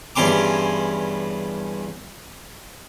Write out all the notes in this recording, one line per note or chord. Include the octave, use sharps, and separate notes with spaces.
E2 G2 C#4 C6 D6